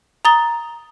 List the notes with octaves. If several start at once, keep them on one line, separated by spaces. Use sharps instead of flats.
A#5 D#6 A6 G7